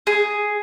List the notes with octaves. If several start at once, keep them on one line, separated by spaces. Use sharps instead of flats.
G#4